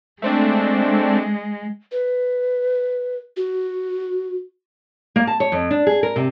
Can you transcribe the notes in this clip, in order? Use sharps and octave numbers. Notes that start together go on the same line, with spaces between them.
G#3 A3 C4 D4
B4
F#4
A#3
A5
C#5
F2
D4
G#4
A#4
C3